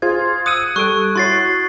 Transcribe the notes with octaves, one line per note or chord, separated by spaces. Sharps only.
F4 G#4 C5 G#6
D#6 E6 F#6 C#7 D#7
G3 A4 C#6 F#6 D7
E4 F#4 C#5 C6 A6 C7